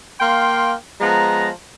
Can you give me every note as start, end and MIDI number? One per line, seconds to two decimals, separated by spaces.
0.21 0.73 58
0.21 0.73 77
0.21 0.73 79
0.21 0.73 84
1.01 1.49 53
1.01 1.49 56
1.01 1.49 59
1.01 1.49 82